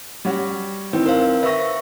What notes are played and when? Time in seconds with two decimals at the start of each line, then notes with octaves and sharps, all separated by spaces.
0.25 G3 C#4 F#4
0.93 D#3 E3 C4 B4
1.06 A#4 C5 F5
1.43 B4 E5 C#6 E6 A#6